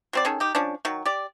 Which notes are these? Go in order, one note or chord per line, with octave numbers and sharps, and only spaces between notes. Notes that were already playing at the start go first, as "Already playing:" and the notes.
F#3 C4 D5
D#3 C#4 G#4 A4
D#4 G4
F3 C#4 D4
D#3 F#3
G4 D5